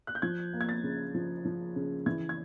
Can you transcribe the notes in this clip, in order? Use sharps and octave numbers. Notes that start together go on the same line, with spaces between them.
F#6
G6
F3 G#6
A#3
G#6
A6
C#3
F3
F3
C#3
E3 G#6
G#6